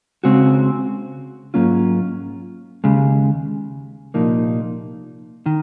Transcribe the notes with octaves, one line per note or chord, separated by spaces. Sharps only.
C#3 G#3 C4 F#4
G#2 F#3 A#3 C#4 F4
D#2 C#3 G#3
C2 A#2 F3 A#3 D#4
D#3